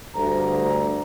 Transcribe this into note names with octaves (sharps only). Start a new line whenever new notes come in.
D2 G2 A#5